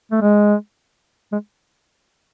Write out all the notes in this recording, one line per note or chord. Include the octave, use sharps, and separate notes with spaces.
A3
G#3
G#3